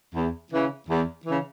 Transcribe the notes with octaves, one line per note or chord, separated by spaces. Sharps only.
E2
C#3 E3
E2
C#3 E3